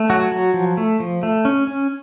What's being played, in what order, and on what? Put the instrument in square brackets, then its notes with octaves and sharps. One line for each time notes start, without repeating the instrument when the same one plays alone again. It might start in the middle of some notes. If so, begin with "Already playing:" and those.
Already playing: [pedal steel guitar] A3
F#3 F#4
F#3
F3
A3
F3
A3
C#4
C#4